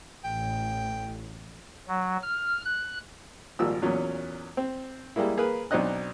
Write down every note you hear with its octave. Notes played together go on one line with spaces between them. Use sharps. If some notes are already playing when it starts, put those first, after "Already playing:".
A1 G5
F#3
F6
F#6
G#1 A#2 F3 G3 E6
E2 A#2 F#3 C#4
C4
G3 G#3 A#3 E4
A#3 G#4 A#4 B4
B1 C4 D4 D#4 D#5 F#6